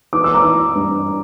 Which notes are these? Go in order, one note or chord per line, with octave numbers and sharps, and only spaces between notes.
E3 D6
E6
A#5 D6
E3
G2